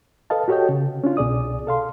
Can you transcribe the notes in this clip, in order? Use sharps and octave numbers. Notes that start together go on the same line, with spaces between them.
A4 B4 D#5 F5 A5
F#4 G4 A4 C#5 D#5 G5
C#3
C#4 D4 F4
C2 B2 G#4 D5 D#6
A4 F5 C6